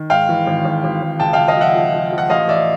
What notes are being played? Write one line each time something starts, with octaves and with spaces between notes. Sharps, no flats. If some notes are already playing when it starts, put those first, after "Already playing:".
Already playing: D#3
G#2 F5 G5
E3
G#1
G#1
G#1
G#1
C#2 G5 A5
C#2 F5 G5
D#5 F5
F3 E5 F#5
F3
F3
F3
F#5
A1 D#5 F5
A1 D5 E5